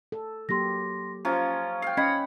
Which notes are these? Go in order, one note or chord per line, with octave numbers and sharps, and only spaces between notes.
A4
F#3 A#3 G4 C6 A#6
F3 C#4 F4 A#5
F5 G5
C#4 D#5 F#5 B5 G#6